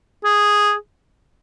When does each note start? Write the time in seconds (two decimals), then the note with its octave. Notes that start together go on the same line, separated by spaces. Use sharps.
0.25 G#4